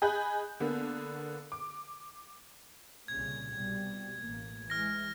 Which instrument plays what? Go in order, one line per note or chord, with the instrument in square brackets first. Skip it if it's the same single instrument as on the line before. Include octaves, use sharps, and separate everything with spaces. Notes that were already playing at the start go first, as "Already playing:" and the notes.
[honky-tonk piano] G#4 D#5 G#5 B5 F#6 G6
D3 A#3 B3
D6
[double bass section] C2 A#2 C#3 [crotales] G#6
[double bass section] C2 B2 G3
A1 A#3
[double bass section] E3 G#3 [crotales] F6 A#6